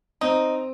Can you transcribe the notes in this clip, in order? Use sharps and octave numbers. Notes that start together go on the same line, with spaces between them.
C4 D#4